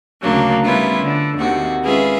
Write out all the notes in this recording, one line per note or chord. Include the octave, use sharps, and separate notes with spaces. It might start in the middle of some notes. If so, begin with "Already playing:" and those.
D2 C#3 F#3 A#3 D4
G3 B3 C#4 E4 F4
D3
D#2 C3 F#4
G#3 C#4 F4 G#4 B4 E5